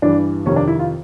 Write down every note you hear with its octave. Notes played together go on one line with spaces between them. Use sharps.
G2 E3 G3 D4
F2 C3 D#3 C#4
D4
E4
F4